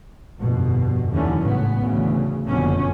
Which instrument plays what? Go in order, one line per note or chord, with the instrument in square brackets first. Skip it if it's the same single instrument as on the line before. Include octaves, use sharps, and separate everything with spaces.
[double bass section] G1 F2 B2
D#2 D3 E3 F#3 C#4
G#1 A2 C#3 B3
D2 C#3 E3
F#1 F2 B2 D3 C#4